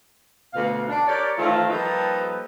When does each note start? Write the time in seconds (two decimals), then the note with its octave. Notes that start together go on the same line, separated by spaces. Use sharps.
0.54 D2 B2 F5
0.88 D4
1.07 G4 A#4 C#5 D5
1.38 D#3 E3 A3 C4 F4
1.70 F3 G3 A#3 D#4 A4 B4